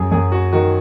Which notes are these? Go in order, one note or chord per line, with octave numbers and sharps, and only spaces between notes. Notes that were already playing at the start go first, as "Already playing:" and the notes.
Already playing: F#2 G#4
F#2 G#4
F#4
D#3 F#4